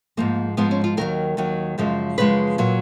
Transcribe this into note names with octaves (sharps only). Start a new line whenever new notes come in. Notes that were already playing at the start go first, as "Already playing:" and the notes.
G#2 F3 G#3 A#3
G#2 F3 G#3 B3
C#4
F4
D#2 D#3 F#3 A#4
D#2 D#3 F#3
F#2 C#3 F3 G#3
F#2 C#3 F3 G#3 B4
A#2 F#3